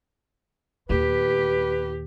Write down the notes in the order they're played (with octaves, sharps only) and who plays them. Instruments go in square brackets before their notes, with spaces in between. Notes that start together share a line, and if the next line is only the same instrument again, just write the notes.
[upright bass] D#2 A#2 [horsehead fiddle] G4 [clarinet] B4